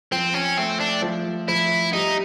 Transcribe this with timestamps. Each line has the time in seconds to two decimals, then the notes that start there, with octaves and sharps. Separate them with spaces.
0.12 F3 C4
0.34 C#4
0.57 A3 C4
0.80 D4
1.02 F3
1.48 F3 E4
1.93 G3 D#4